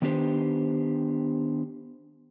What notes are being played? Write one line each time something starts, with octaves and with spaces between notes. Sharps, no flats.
D#3 B3 D4 G4 C5